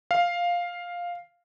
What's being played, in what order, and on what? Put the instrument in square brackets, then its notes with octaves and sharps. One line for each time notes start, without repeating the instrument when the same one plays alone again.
[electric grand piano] F5